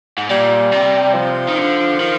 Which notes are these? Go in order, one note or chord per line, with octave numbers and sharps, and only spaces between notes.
G#2
A#2 G3
C3
F3
D#3
D3
D#3